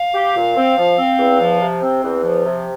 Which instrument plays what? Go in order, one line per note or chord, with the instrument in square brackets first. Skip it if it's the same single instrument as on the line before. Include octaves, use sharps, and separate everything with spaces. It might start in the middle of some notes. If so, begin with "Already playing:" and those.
Already playing: [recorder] F5
[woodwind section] G4
A#2
C4
F3
C4
E2
F3
C3
C4
E2
F3
C3